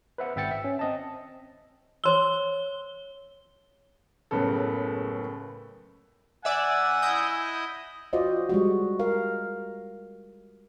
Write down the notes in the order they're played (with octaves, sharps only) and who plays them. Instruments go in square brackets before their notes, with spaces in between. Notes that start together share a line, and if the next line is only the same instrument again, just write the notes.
[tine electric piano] B4 C5 E5 F#5
G#1 E5 G5 A6 C#7
E5
C#4
C4 D#5 A5
[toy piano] C5 C6 E6 [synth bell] C#5 G7
[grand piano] F#1 A2 C#3 B3 A4
[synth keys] D5 E5 [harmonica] F#5 G#5 [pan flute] E6
[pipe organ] E4 D#5 [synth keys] D#6 G6
[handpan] F4 F#4 C5 D5 D#5
G3 G#3 F#4
A#4 F5